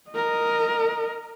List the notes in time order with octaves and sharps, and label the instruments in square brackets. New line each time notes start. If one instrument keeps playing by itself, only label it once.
[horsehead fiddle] A#4 D#5